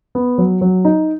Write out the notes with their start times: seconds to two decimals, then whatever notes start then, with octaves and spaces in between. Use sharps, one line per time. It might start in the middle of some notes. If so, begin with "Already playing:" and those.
0.15 B3
0.38 F#3
0.61 F#3
0.85 D#4